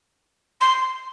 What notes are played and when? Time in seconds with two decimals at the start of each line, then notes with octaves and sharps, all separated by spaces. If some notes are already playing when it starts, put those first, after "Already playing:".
0.60 C6